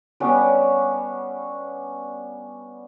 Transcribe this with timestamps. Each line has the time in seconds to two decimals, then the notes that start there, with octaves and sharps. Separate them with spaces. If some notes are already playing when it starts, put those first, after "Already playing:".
0.20 G3 B3 C#4 D4